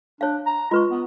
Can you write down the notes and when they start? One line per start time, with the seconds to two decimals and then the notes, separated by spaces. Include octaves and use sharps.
0.21 D4 C#5 F5
0.46 A#5
0.71 G#3 F4 B4 C#6
0.91 B3